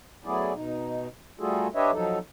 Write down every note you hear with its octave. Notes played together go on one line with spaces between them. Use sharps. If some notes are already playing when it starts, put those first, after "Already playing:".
F#3 A3 B3 E4 G#4 D5
B2 D#4
G3 A3 F4 F#4 G#4 A4
D4 G4 B4 C#5 D#5 E5
F3 F#3 D#4 A4